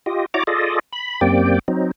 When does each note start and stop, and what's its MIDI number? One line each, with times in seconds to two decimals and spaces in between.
0.06 0.26 65
0.06 0.26 67
0.06 0.26 75
0.34 0.43 64
0.34 0.43 66
0.34 0.43 73
0.34 0.43 74
0.34 0.43 82
0.34 0.43 86
0.47 0.79 65
0.47 0.79 68
0.47 0.79 69
0.47 0.79 74
0.47 0.79 75
0.93 1.21 83
1.21 1.59 42
1.21 1.59 58
1.21 1.59 60
1.21 1.59 67
1.21 1.59 74
1.21 1.59 79
1.68 1.91 54
1.68 1.91 60
1.68 1.91 63